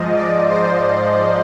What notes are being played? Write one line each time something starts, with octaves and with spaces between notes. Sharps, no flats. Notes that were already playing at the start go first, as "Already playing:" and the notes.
Already playing: G#2 F3 D#5
D5
C5